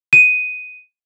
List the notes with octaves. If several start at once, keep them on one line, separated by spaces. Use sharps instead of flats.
D#7